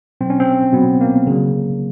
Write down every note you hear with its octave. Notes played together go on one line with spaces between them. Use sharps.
B2 F#3 C4
C#4
C4
B2 F#3 B3
A#3
C#3 F#3